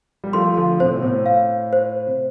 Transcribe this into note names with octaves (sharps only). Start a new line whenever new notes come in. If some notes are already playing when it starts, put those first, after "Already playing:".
G3
F3 A3 C6
D3 F3
A2 C3 C5
B2
A2
F5
C5
C3